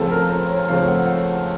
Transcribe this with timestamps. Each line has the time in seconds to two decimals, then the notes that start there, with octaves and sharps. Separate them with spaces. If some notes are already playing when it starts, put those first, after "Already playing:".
Already playing: C#2 C#3 F3 A3 C4 A4
0.11 A#4
0.30 C5
0.49 C#5
0.68 C#2 C#3 F3 A3 C4 F5
0.88 F#5